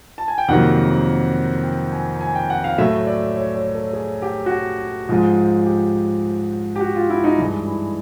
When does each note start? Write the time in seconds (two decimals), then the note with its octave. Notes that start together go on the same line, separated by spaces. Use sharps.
0.18 A5
0.28 G#5
0.38 G5
0.48 F2 C3 D#3 F#3 A#3 F#5
1.63 G5
1.92 G#5
2.21 G#5
2.35 G5
2.50 F#5
2.64 F5
2.78 A2 F#3 A3 E5
3.07 D5
3.36 C#5
3.55 C#5
3.74 A4
3.93 G#4
4.22 G4
4.46 F#4
4.51 G4
5.09 G#2 F3 G#3
5.66 G4
6.76 G4
6.81 F#4
6.95 F4
7.10 E4
7.24 D#4
7.38 G2 E3 G#3 D4
7.67 E4